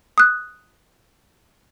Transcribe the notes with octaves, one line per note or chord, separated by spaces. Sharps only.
D#6 F#6